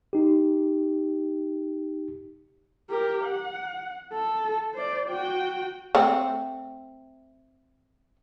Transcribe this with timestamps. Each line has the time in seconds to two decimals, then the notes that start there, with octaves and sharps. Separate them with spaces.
0.13 D#4 G4
2.90 G4 A#4
3.25 F#5
4.13 A4
4.74 C5 D5
5.09 F#4 G5
5.95 A3 C4